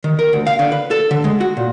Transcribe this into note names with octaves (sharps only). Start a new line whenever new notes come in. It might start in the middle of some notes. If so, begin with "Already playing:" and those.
D#3
A#4
D2
F5
D3
B4
A4
D3
G#3
F#4
A#2